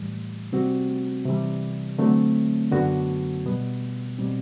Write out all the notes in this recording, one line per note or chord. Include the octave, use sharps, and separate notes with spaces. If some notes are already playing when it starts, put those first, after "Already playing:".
Already playing: A2 E3 G3
C3 G3 C4 F#4
C3 E3 G3
D3 F#3 A3 C4
F#2 D3 F#3 B3 F#4
B2 G3 B3
B2 G3 C4